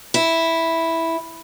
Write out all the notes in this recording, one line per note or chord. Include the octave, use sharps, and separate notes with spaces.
E4